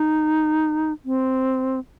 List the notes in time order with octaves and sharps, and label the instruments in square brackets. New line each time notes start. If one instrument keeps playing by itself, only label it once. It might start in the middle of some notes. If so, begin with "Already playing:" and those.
Already playing: [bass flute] D#4
C4